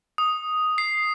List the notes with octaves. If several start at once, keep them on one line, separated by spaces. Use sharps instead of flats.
D#6
C7